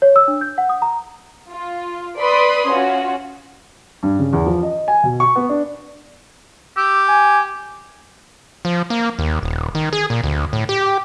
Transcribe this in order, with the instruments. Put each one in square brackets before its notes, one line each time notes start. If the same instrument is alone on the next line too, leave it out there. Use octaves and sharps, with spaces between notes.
[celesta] C#5
E6
D4
G6
F#5
D#6
A#5
[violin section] F4
B4 D5 B5 C6 D#6
C#4 F4 F#4
[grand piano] G2
C#3
E2
F3
D#5
G#5
B2
C#6
B3
D4
[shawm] G4 [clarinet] E6
[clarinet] G#5
[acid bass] F3
A#3
D#2
D#1
D#3
G#4
A#2
D2
A2
G4